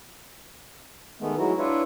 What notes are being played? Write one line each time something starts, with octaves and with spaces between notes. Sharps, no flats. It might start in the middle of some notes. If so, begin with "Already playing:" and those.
D#3 G#3 A3 B3
F#3 G#3 D#4 E4 F#4
D4 E4 F4 B4 C#5 E5